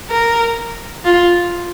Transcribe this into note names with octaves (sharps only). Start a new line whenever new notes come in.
A#4
F4